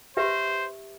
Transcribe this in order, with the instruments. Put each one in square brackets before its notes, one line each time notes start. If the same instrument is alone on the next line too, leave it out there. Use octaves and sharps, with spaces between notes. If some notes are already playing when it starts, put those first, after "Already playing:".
[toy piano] G4 B4 E5 [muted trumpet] C5